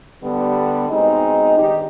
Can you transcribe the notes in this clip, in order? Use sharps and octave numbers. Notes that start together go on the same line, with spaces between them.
D3 G3 B3 D4
B2 G#3 C4 D#4
G2 D#3 D#4 G4